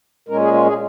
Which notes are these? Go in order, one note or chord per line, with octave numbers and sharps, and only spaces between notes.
A#2 G#3 C#4 A#4
G#4
F4
G#4